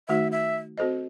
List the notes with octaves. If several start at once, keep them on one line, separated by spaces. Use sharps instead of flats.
D#3 A3 D#4 F#4 E5
E5
C4 F#4 A4 C5 D#5